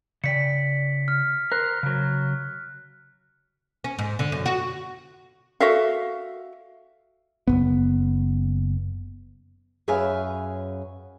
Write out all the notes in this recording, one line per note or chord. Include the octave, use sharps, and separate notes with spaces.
C#3 D5 G5 B6 C#7
F6
A#4 C5 F#6
C#3 F#3
C#4
G#2
D3
F#2
F#4
F#4 A4 E5 F5
F#1 F#2 B3
F#2 G#4 B4 E5 F5 G#5